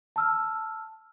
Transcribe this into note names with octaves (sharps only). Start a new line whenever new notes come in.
A5 E6 F6